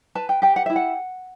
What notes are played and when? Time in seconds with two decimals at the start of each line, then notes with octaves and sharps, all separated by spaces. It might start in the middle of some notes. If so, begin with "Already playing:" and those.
0.15 B4 A5
0.29 G5
0.42 G4 G5
0.56 F#5
0.66 E4 E5
0.76 F#5